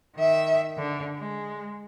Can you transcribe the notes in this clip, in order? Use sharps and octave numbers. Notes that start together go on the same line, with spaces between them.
D#3 E5
D3
G#3